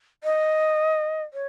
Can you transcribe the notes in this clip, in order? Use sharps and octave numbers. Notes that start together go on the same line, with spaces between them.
D#5
C#5